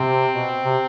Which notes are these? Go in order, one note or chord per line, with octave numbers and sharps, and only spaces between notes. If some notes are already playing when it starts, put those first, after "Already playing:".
Already playing: C3 C4
B2
C3